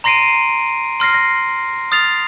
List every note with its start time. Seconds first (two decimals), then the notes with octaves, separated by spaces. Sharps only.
0.04 A#5 C6 A#6 C7 D7 D#7
1.00 C6 F6 A#6 C7
1.14 A#6
1.92 D#6 F6 A6 C7 F7